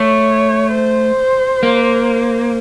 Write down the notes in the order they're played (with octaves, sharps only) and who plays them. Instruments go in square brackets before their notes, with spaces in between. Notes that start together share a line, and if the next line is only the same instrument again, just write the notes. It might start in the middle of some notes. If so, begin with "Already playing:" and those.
Already playing: [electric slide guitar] A3 [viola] C#5
[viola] C5
[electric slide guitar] A#3